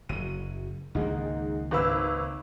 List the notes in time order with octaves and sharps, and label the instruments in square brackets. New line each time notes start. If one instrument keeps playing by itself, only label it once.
[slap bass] F#1 F#3 [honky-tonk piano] D#7
[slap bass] C#2 D#3 A#3 [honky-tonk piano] G#2 D#4 G#4
[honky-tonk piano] G#1 B4 E6